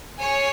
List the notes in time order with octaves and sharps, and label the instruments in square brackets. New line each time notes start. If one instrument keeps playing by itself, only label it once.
[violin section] G#4 C#5 G#5